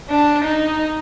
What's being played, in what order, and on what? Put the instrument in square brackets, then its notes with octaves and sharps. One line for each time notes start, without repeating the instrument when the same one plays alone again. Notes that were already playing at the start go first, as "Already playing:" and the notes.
[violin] D4
D#4